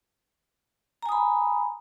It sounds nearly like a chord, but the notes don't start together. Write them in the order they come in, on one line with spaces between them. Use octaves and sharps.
A#5 G#5 D#6 B5